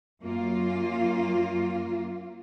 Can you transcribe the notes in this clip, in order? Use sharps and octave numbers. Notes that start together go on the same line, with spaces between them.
F#2 A#3 F4